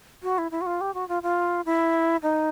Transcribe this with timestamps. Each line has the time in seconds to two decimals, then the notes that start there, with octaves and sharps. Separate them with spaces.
0.23 F#4
0.38 E4
0.51 E4
0.61 F#4
0.66 F4
0.81 G4
0.94 F#4
1.09 F4
1.23 F4
1.65 E4
2.23 D#4